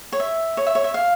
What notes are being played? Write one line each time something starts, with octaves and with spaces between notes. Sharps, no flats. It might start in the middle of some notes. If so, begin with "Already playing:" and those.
C#5
E5
C#5
E5
C#5
E5
F5